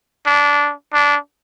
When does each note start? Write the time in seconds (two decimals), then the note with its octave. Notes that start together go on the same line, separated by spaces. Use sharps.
0.26 D4
0.93 D4